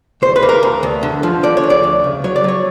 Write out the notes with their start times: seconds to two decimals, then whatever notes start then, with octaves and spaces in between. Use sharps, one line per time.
0.22 D2 C5
0.36 B4
0.43 A#3
0.49 A#4
0.63 D2
0.83 D2
1.03 D3
1.23 F3
1.43 D3 D5
1.57 C#5
1.63 D2
1.70 D5
1.84 D2
2.04 C#3
2.24 F#3 C#5
2.36 D5
2.44 F#3 C#5